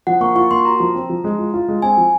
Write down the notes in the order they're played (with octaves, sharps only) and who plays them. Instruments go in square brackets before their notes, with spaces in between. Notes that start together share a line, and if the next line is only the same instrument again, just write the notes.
[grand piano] F3 [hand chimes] F#5
[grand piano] A#3 [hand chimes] C#6
[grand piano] F4 [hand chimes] C#6
[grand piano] A#3 [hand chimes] C6
[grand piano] F#4 [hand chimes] A#5
[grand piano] F3
C4
F3
G#3
F4
F4
G#3
[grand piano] C4 [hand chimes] G#5
[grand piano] F3